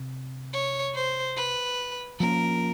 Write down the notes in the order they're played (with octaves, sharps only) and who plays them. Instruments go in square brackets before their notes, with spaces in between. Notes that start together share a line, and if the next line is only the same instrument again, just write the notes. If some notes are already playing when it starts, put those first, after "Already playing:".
Already playing: [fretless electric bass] C3
[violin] C#5
C5
B4
[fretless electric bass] F3 A#3 C#4 [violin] A#4